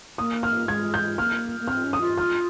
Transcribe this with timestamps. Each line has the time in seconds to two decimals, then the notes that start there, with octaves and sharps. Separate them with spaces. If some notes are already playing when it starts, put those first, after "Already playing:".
0.18 A#3 D#6
0.43 F6
0.68 G#3 G#6
0.94 G6
1.18 A#3 F6
1.60 A#3
1.68 C4 F6
1.84 C#4
1.93 D#6
2.01 F4
2.18 F6